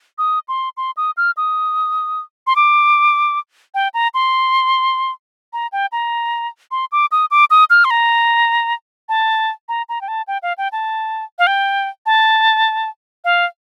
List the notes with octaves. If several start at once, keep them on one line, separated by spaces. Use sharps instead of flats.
D#6
C6
C6
D#6
F6
D#6
C6
D6
G5
A#5
C6
A#5
G5
A#5
C6
D6
D#6
D6
D#6
F6
C6
A#5
A5
A#5
A#5
G5
A5
G5
F5
G5
A5
F5
G5
A5
F5